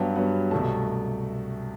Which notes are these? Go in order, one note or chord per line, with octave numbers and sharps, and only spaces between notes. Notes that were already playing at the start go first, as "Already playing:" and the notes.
Already playing: G2 F#3 B3 A5
G2 F#3 B3
C2 B2 A3 A5